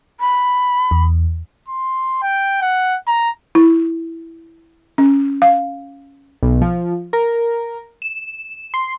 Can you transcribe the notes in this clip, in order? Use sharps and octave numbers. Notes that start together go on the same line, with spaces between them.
B5
E2
C6
G5
F#5
A#5
E4
C#4
F5
B1
F3
A#4
E7
C6